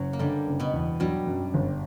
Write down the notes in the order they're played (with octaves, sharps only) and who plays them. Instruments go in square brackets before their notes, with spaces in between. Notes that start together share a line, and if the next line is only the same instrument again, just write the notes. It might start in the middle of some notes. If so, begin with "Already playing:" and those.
Already playing: [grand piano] F#1 [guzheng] F#2 F#3
[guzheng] A#3
[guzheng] G2 G3 [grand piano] D3
[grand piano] F#1
[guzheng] B2 B3
[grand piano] E2
[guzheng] G2 G3 [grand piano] F#3
[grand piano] F#2
G1